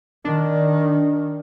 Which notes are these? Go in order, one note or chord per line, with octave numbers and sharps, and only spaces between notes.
D#3 D4